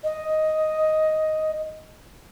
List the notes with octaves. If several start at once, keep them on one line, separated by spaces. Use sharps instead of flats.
D#5